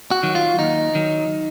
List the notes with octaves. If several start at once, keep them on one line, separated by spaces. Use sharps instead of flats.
F#4
D#3 F#3
F4
D#2 D#4
D#3 F#3